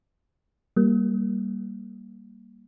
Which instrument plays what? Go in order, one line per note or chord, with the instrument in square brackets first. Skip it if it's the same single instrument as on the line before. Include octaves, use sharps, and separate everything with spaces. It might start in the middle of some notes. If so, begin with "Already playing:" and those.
[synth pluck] G3 A#3